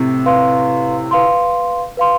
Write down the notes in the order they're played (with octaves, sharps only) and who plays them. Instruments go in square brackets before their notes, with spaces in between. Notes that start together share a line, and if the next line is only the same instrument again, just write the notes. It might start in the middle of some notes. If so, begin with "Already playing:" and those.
Already playing: [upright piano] A2 C3
[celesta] B4 F5 C6
B4 F5 C6
B4 F5 C6